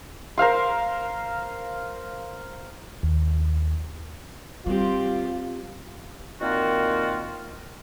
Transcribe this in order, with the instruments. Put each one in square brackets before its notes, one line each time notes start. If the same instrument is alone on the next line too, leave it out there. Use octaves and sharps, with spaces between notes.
[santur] A#4 C5 F5 C6
[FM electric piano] D#2
[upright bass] G3 [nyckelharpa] C4 G4 [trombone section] F4
[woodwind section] A#2 D#3 A#3 C4 F4 F#4